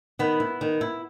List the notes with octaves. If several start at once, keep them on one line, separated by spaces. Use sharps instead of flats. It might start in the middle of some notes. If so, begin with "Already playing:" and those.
D#3 B3
E4
D#3
E4